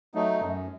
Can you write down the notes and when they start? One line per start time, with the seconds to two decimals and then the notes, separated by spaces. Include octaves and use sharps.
0.15 F#3 A3 D#4
0.41 F#2